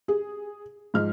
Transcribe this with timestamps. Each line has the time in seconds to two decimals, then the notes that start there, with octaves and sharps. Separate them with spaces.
0.08 G#4
0.94 G#2 F3 F6